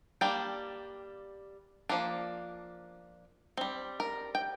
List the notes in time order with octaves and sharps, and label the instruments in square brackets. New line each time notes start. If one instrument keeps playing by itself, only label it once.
[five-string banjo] G3 A#3 D4 G5
F3 A#3 D4
G3 C4
A#4
G5